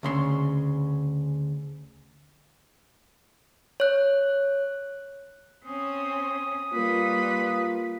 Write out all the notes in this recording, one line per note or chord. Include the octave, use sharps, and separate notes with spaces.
D2 C#3 C6
C#5 F#6
C4 C#4 D#6
G3 A#3 F4 B4